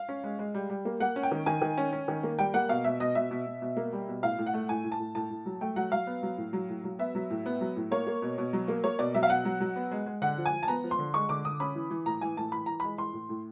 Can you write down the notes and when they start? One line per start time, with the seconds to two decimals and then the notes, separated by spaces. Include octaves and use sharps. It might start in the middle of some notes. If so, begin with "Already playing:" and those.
Already playing: F5
0.09 C#4
0.24 G#3
0.39 G#3
0.54 G3
0.70 G3
0.85 A#3
1.00 A#3 F#5
1.16 C#4
1.23 G5
1.31 D#3
1.46 D#3 G#5
1.62 D#3
1.78 C#4
1.92 C#4
2.08 D#3
2.23 A#3
2.39 G3 G5
2.54 A#3 F#5
2.69 B2 F5
2.84 B2 E5
3.00 B2 D#5
3.15 B2 E5
3.31 B2
3.46 B2
3.62 B2
3.77 A#3
3.93 G3
4.08 B2
4.23 A2 F5
4.38 A2
4.46 F#5
4.54 A3
4.69 A2 G#5
4.84 A2
4.92 A5
4.99 A2
5.15 A2 A5
5.30 A2
5.46 F#3
5.61 A3 G5
5.76 F#3 F#5
5.92 F#3 F5
6.07 B3
6.23 F#3
6.37 A2
6.53 F#3
6.69 A2
6.84 F#3
6.99 B3 E5
7.15 F#3
7.30 A2
7.46 B3
7.61 F#3
7.76 A2
7.91 A#3 C#5
8.07 A#3
8.22 B2
8.38 B2
8.53 F#3
8.68 A#3
8.84 A#3 C#5
8.99 B2 D5
9.14 F#3 E5
9.23 F5
9.30 B2 F#5
9.45 F#3
9.61 F#3
9.76 B3
9.91 G#3
10.06 G#3
10.22 D3 F#5
10.38 F3
10.46 G#5
10.53 F3
10.63 A5
10.68 B3 A#5
10.84 F3
10.91 C6
10.99 D3
11.14 G#3 C#6
11.29 D3 D6
11.45 D3 D#6
11.60 C#4 B5
11.75 E3
11.91 E3
12.06 A2 A#5
12.21 E3 G#5
12.37 A2 A5
12.52 E3 B5
12.66 E3 A#5
12.80 G#3 B5
12.98 E3 C6
13.13 A2
13.29 A2